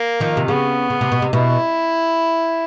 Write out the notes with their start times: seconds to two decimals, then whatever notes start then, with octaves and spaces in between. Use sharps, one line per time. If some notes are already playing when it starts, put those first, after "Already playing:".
Already playing: A#3
0.20 D#3 F3
0.37 C3
0.48 C#3 B3
0.90 C#3
1.01 C3
1.12 B2
1.22 C3
1.33 B2 E4